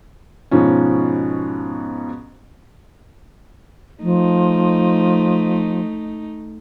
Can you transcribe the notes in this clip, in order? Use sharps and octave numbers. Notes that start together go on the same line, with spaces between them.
G#2 B2 F3 C#4
F3 A3 D#4